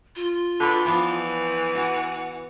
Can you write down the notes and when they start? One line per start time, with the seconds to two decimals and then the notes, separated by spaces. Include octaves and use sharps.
0.16 F4
0.60 D3 B4 G5
0.85 E3 F3 B3 D4
1.75 F#4 F#5